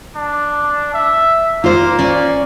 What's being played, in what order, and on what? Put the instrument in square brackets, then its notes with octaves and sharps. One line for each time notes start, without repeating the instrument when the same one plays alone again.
[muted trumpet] D4
E5
[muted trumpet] A#3 [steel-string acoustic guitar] F4 C5
[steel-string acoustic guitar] C#4 D5